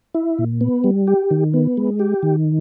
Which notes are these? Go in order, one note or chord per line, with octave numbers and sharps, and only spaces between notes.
E4
A#2
B3
G3
G4
D#3
B3
G#3
G4
D#3